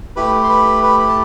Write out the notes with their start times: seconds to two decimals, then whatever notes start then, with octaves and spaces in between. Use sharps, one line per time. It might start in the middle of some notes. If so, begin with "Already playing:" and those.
0.16 A3 E4 G4 B4 B5
0.44 C6
0.50 B4 B5
0.83 B4 B5
1.00 B5
1.09 A5